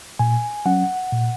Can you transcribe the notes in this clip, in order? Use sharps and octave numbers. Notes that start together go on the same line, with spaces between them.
A#2 G#5
F#3 C#4 F#5
A#2